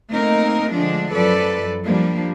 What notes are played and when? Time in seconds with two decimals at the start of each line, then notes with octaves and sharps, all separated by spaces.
0.12 A3 A#3 C4 D#4 A#4
0.72 D3 F3 G#3 A3 D4
1.14 F#2 F3 A4 B4 D5
1.84 F3 G3 A#3 D4